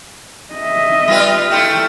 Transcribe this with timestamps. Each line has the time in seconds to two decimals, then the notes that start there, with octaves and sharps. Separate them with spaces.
0.54 D#5 E5
1.08 G3 F4 B4
1.51 A3 E4 F4 G5